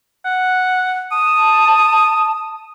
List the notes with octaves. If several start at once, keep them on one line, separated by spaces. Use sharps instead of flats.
F#5
A5 D#6